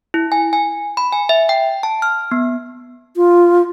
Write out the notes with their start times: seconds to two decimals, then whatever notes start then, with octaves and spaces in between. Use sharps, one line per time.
0.14 E4
0.32 G#5
0.53 G#5
0.97 B5
1.13 G#5
1.29 E5
1.49 G5
1.83 A5
2.02 F6
2.31 B3
3.17 F4